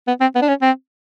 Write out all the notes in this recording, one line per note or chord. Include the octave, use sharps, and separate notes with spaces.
B3
C4
B3
D4
C#4
C4